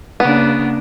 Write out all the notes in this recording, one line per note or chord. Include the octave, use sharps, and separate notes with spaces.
C#3 A#3 B3 D4